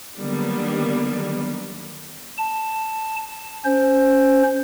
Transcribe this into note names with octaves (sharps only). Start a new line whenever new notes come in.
D3 D#3 F#3 G3 A#3 B3
A5
C#4 C5